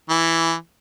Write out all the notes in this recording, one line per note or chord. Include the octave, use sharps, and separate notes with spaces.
E3